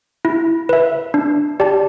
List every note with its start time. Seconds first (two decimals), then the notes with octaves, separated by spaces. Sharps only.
0.25 E4
0.69 B4 E5
1.14 D4
1.60 G4 D5 A5